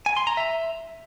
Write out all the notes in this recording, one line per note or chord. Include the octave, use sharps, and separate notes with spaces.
G#5
C6
A#5
E5